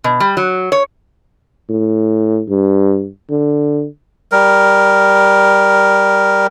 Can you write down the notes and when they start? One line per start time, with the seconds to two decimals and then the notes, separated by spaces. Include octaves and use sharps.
0.04 B2
0.20 G3
0.37 F#3
0.72 C#5
1.70 A2
2.49 G2
3.31 D3
4.32 G3 A#4